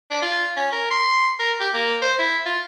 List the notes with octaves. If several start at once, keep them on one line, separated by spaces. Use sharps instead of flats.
D4
F4
C#4
A#4
C6
A#4
G4
A#3
C5
E4
F4